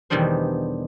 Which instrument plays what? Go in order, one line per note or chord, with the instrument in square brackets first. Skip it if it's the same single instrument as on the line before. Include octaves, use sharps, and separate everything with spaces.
[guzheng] E2 B2 D#3 G3 D4 C5